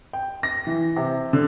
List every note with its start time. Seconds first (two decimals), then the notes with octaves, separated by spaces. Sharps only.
0.13 G5
0.43 A#6
0.67 E3
0.96 C3
1.33 D3